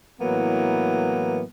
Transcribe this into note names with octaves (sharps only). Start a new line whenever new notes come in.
A2 E3 F#3 A#3 B3